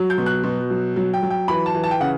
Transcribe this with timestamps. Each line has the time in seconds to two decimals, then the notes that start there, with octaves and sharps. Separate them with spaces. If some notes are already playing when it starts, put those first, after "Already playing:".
Already playing: F#3
0.10 G6
0.18 B2
0.26 F#6
0.43 B2
0.70 F#3
0.96 F#3
1.13 G5
1.23 F#3
1.30 G5
1.48 E3 B5
1.66 A5
1.75 E3
1.84 A5
1.91 G5
2.00 C#3 F#5